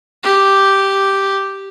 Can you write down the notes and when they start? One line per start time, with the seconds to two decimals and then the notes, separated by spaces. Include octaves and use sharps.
0.23 G4